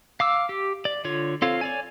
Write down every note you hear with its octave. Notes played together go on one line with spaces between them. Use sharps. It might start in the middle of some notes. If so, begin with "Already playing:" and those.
F5 D6 E6
G4
D5
D3 F4 C#5
C4 F4 A4 C#5 F5
C#5 D5 G#5